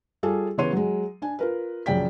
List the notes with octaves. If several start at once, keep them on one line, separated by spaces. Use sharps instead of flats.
G3 F4 G#4 A4
C#3 E3 B3 C#5 C6 D#7
F#3 G#3
D4 G#5
F4 A#4 B4
A#1 F#2 C#3 D5 G5 B6